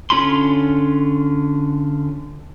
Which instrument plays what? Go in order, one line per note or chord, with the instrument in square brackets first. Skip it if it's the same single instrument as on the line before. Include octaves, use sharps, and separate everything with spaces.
[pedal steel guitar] D3 C#4 F4 B5 C6